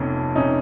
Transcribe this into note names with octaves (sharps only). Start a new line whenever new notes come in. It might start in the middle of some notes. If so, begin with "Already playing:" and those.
Already playing: F1 F2 C3 B3 C#4
C3 C#4 D#4